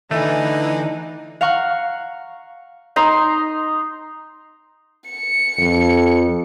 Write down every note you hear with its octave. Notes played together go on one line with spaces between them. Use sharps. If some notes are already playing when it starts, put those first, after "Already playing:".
D3 E3 A3 D#4 B4
F5 F#5 A#5 C#6
D#4 A#5 C6
C#7
F2